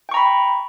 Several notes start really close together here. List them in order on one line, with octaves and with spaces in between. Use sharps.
G5 C#6 A#5 B5